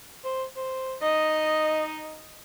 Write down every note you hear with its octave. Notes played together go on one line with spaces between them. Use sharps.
C5
C5
D#4 D#5